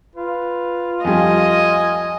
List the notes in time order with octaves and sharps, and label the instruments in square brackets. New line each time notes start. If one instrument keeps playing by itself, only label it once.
[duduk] F4 [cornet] B4
[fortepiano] F2 G3 [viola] D#5 [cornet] G#5